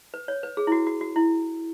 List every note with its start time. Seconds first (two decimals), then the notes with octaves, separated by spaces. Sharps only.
0.14 B4
0.28 C#5
0.43 B4
0.57 G#4
0.67 E4
0.72 F#4
0.87 F#4
1.01 F#4
1.16 E4